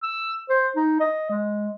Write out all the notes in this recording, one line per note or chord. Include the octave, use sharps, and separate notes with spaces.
E6
C5
D#4
D#5
G#3